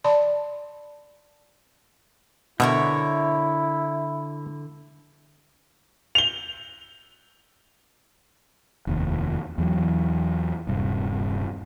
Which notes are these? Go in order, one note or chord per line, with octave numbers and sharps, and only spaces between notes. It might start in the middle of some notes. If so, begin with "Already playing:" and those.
D5 A5 B5 C6
B2 D3 E4 A#4 C#5 E5
F7 G7
F1 D#2
E2 E3 F#3
D#1 G2 C3